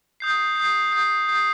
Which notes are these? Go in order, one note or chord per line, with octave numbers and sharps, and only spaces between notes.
D#6 G6 C7
D#6 G6 C7
D#6 G6 C7
D#6 G6 C7